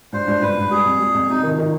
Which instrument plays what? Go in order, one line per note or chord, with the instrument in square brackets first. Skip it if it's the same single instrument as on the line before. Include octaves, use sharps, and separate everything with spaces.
[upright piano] G2 [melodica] C5
[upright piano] G2
[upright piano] G2 [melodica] B4
[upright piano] G2
[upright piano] G3 [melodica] G#4
[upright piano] F2
G3
F2
[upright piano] C3 [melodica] D#4
[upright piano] D#3
D#3